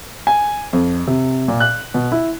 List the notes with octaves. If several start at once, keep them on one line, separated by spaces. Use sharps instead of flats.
G#5
F2
C3
A#2
F#6
B2
E4